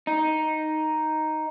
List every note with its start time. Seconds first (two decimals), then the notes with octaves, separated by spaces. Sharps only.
0.07 D#4